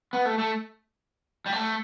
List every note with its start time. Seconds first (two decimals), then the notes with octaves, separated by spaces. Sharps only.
0.13 B3
0.26 A3
0.38 A3
1.46 G3
1.52 A3